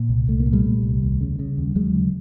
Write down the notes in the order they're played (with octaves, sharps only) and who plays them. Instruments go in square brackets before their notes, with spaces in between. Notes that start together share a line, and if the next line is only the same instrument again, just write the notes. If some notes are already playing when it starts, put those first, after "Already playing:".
Already playing: [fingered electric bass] A#2
C2
C2 A3
A#3
A#2
G3 A3
A#2
C2
D#2
C#3
C#3
D#2
D#2 F#3 G#3
C#3